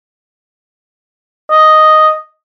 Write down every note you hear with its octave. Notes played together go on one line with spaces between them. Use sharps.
D#5